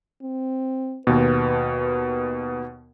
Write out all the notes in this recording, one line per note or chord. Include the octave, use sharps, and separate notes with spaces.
C4
D#2 B2 B4